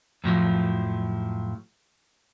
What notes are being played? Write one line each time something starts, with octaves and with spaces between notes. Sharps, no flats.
F2 A2 F3 F#3